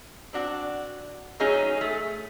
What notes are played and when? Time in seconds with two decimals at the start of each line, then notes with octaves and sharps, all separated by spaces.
0.33 C4 D4 F#4
1.40 F#3 A3 C#4 D#4 G#4
1.77 A3 G#4